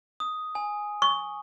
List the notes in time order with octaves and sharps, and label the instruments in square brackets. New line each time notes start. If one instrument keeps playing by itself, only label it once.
[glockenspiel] D#6
G#5
[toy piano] C#6